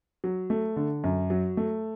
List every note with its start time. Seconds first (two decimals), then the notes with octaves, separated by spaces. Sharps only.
0.24 F#3
0.50 A3
0.76 D3
1.04 F#2
1.30 F#3
1.57 A3